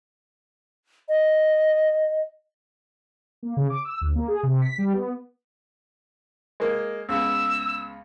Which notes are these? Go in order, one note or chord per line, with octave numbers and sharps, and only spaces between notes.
D#5
A#3
C#3
D6
E6
D2
A#3
G#4
C3
B6
G3
B3
G#3 A#3
C#2 C#3 B3 E6